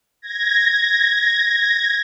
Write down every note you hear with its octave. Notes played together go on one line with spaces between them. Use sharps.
G#6 A#6